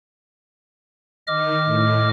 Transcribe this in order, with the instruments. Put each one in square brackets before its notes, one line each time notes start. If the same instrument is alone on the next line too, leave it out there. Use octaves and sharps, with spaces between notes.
[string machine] D#3 [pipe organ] D#5 D6 F6
[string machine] A2